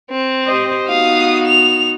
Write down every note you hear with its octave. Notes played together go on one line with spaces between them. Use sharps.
C4
G4 C5 D#5
B3 D#4 F#4 F5 D#6
F7